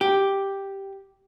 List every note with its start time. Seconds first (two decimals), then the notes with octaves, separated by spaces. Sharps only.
0.01 G4